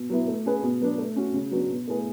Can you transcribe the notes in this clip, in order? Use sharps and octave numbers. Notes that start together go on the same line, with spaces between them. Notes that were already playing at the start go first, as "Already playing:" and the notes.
Already playing: B2
F#3 B3 E4
A3
C#4 G#4 B4
B2
F#3 B3 D4
A3
C#4 F#4
C#3
F#3 B3 D4 F#4
B2
A3 E4 G#4 B4